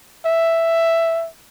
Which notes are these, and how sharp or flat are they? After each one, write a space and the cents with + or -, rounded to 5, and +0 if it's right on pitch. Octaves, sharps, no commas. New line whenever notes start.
E5 +5